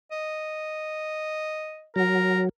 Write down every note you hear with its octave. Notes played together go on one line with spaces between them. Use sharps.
D#5
F#3 A#4